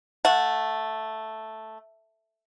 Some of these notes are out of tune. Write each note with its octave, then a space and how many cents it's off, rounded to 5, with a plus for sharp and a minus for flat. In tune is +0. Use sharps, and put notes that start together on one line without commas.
A3 +0 F#5 -25